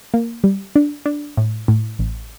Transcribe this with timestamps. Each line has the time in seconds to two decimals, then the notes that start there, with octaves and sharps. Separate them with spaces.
0.14 A#3
0.44 G3
0.76 D4
1.06 D4
1.37 A2
1.68 A2
1.99 A1